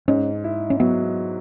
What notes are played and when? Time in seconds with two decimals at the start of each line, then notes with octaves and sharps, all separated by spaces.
0.08 G#2 C#4
0.44 E4
0.70 C#4
0.80 F#3 B3